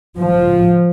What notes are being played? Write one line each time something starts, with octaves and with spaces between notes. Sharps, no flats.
F3